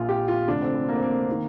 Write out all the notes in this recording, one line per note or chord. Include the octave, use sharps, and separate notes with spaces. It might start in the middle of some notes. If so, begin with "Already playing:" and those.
Already playing: A#1 A#2 F4
G4
F4
F1 F2 D3 D4
C4
C4
A#3
C4
A#3
D#3